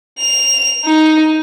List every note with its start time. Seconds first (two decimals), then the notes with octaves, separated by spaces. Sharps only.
0.19 F7
0.85 D#4